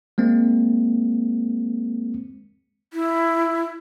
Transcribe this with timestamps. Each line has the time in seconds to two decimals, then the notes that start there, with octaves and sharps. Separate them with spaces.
0.18 G#3 A#3 C4
2.93 E4